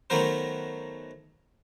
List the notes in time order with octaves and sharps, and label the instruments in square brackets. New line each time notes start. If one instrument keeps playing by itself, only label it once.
[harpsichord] D#3 F#3 A3 B3 A#4 C5